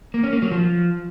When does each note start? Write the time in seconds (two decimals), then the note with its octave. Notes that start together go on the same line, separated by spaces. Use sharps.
0.14 A#3
0.23 C#4
0.33 A#3
0.42 F#3
0.51 F3